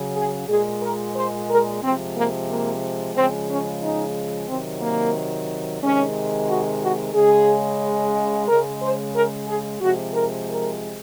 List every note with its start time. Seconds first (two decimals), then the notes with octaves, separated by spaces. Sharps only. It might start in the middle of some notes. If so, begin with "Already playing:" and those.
Already playing: C#3 F#3
0.16 G#4
0.48 A#2 G#3 G#4
0.81 A#4
1.15 C5
1.49 A#4
1.82 C3 F3 G#3 C4
2.15 A#3
2.49 A#3
3.15 C#3 F3 G#3 C4
3.48 C#4
3.82 D#4
4.48 C3 D#3 F#3 C4
4.81 A#3
5.82 C3 D#3 G#3 C#4
6.49 F#4
6.82 F#4
7.14 C#3 G#3 G#4
8.48 C#3 G#3 A#4
8.81 C5
9.14 A#4
9.48 G#4
9.81 C3 F3 G#3 F#4
10.14 A#4
10.48 A#4